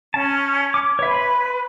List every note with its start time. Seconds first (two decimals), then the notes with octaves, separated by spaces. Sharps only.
0.14 C#4 A5
0.74 D6
0.99 B4 C#5 E5
1.11 B5 C6